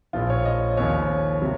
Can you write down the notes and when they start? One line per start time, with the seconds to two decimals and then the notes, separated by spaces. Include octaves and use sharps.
0.13 A#1 A#2 F3 F4
0.30 C#5
0.45 D#5
0.77 D#2 C#3 F3 C#5
1.42 C3 F#3